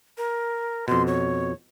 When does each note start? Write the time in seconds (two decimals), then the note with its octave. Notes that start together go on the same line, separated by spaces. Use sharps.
0.18 A#4
0.88 F2 B2 C6
1.07 C#5